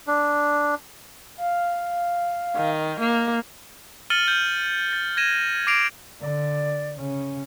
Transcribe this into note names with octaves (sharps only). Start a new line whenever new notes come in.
D4
F5
D#3
A#3
F6 A6 C#7 D#7 F#7 G7
G6
A6
G#6 A#6 D#7 E7
D6 A#6 C7 D7 F7
D3 D5
C#3 C#4